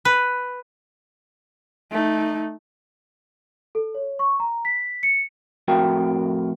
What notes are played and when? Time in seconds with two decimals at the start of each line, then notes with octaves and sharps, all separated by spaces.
0.05 B4
1.92 A3 D#4
3.75 A4
3.94 C#5
4.19 C#6
4.40 A#5
4.65 B6
5.03 C#7
5.68 F2 A2 F#4 A#4 G5